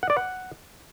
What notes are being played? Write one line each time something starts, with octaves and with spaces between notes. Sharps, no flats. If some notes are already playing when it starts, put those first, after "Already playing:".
F#5
D5
F#5